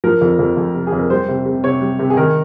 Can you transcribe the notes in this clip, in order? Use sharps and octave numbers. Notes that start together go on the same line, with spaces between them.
F3 A#4
F2
F2
F2
C3
G#4
F2
A#4
G3 C5
C3
C3
C3 C#5
G3
C3
G#4
D#3 A#4